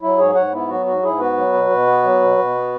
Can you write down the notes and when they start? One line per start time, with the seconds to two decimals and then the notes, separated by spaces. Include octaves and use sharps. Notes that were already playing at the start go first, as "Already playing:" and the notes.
0.02 F#3 E4
0.18 G#2 G#4 C#5
0.35 G#2 C#5 F#5
0.52 B3 E4
0.69 F#3 F#4
0.86 G#2 F#4
1.03 G#2 E4 G#4
1.19 B3 F#4 B4
1.37 F#3
1.53 B2
1.70 B2
1.87 B3
2.03 F#3
2.20 B2
2.38 B2
2.55 B3